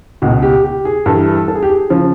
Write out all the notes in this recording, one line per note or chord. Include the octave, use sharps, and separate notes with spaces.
C#2 B2 F#4
G4
G4
G#4
G2 E3 A4
A4
G#4
G4
G#4
C#3 F3